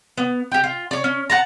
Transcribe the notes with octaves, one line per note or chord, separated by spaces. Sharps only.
B3
G4 G5
F4
C#5 D5
C#4
F#5 A5 A#5